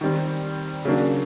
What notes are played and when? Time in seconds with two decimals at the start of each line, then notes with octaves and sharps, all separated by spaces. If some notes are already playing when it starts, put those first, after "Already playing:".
0.01 D#3 G3 C4
0.85 C#3 F#3 A#3 D4